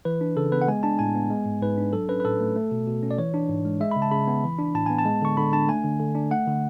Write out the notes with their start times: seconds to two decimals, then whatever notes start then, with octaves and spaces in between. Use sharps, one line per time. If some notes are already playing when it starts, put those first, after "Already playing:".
0.05 E3 B4
0.21 D4
0.37 C#3 A4
0.52 B3 B4
0.62 F#5
0.68 G#3 G#5
0.83 D4 A5
0.99 A2 G#5
1.15 B3
1.30 G#3
1.46 G#2
1.62 G#2 B4
1.78 D4
1.93 F#3 A4
2.09 C#4 B4
2.20 B4
2.24 A2 A4
2.40 A3
2.56 A3
2.72 B2
2.87 B2
3.03 C#4
3.11 D5
3.18 E3 C#5
3.34 D4
3.49 G#2
3.65 G#3
3.80 G#3 E5
3.91 B5
3.96 C#3
4.02 A5
4.11 C#3 B5
4.28 B3
4.44 E3
4.59 D4
4.75 A2 A5
4.86 B3 G#5
4.99 A5
5.05 G#3
5.22 D3 C#6
5.37 D3 B5
5.53 D4 A5
5.69 A3 G#5
5.84 D3
6.00 D3
6.15 D4
6.31 A3 F#5
6.47 D3